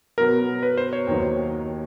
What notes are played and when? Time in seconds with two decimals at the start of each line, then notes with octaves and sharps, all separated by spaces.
0.18 B2 F#3 B3 A#4
0.63 B4
0.78 C5
0.93 C#5
1.07 D#2 D#3 F#3